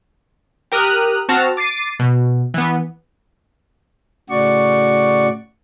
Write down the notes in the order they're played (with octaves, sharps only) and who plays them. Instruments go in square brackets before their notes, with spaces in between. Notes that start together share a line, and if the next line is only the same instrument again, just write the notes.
[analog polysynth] G4 A#4 D#6 F6 F#6
C4 F#4 A5 F6 A#6
D6 A6 C7 D#7
B2
E3 B3
[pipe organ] A2 C#3 F#4 D5 C#6